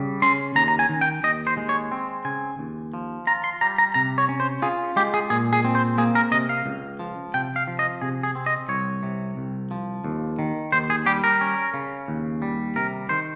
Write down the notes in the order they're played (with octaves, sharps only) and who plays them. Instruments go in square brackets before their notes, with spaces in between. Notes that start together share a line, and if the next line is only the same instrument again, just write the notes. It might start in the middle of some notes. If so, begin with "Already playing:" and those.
Already playing: [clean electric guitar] C#3 G3
C#4 C6
D#2 A#5
A#5
G#5
D#3
G5
D#2 D#5
C5
G#3
C#5
C4
C#3 G#5
D#2
F3
F4 A#5
C6
G3 A#5
A#5
C3 A#5
C#5
C#4
C5
F4 G#4
G#3 G4
G#4
A#2 G#4
G#4
C4
C5
A#3 G#4
A#4
C3 D#5
F5
C#2
F3
C3 G5
F5
F3
D#5
C3 G#4
G#4
C4
D#5
C2 C#5
C3
C2
F3
D#2
D#3
D#2 C5
G#4
G3 G4
A#4
C#4
C#3
D#2
G3
C3 A#4
D#3 C5